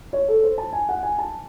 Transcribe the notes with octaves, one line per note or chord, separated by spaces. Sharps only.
C#5
A4
C5
A5
G#5
F#5
G#5
A5